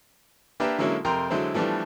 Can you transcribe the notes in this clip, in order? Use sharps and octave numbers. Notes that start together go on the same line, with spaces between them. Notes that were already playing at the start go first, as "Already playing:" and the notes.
A#3 D4 G4 A#4 B4 E5
D3 F#3 G#3 A#3 C#4 E4
F2 C3 A#4 G5 A#5 C6
D3 F#3 G#3 E4 C5
E3 F3 G3 A3 B3 D4